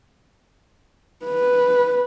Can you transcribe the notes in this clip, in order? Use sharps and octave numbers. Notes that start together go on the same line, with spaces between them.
B4